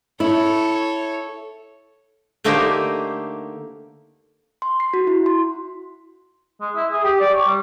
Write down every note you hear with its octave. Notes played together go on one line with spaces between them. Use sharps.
E4 A4 C#5
D3 A3 A#3 D#4 G4 C5
C6
C7
F#4
E4
C6
G#3
E4
G#4
G4
D5
C#5
G3